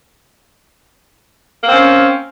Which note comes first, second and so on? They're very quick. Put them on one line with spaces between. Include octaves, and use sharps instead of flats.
A#3 C4 C#4